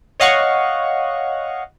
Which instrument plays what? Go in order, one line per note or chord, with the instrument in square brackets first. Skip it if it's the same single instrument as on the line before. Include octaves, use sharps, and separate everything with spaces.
[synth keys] C#5 D#5 F5 F#5 C#6